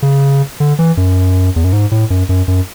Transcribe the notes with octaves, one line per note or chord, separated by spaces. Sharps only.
C#3
D3
E3
F#2
E2
F#2
G#2
A2
F#2
F#2
F#2